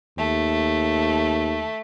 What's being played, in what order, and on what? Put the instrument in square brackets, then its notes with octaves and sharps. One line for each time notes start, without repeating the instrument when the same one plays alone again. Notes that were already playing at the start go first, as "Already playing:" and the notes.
[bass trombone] D#2 [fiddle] A3